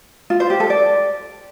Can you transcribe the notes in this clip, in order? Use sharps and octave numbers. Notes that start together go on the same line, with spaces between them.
F4
C5
G4
A4
D5